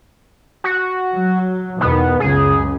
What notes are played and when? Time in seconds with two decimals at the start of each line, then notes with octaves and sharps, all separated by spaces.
0.64 F#4
1.13 F#3
1.81 E2 B2 D#3 B3
2.20 C#2 F#2 C#3 G#4